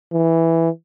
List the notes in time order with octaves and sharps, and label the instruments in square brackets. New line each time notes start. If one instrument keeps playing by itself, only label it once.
[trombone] E3